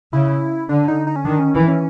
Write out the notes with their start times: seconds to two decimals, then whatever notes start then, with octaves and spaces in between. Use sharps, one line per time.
0.13 C#3 E4
0.69 D3 D4
0.88 D#4
1.07 D#4
1.16 C#4
1.25 D#3 D4
1.39 C#4
1.54 E3
1.68 C#4